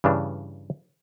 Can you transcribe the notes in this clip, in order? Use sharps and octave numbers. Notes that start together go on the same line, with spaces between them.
G2 C#3 E3 D4